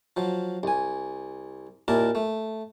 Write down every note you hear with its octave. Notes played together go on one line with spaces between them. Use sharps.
F3 F#3
C2 G#5
D#2 A#2 E4 A#4 A5
A3